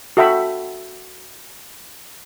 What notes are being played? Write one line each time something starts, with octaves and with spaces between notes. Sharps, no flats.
F#4 A4 E5 G5 B5